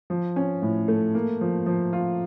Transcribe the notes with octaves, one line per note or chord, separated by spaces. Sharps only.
F3
C#4
A2
A3
A#3
F3
F3
F4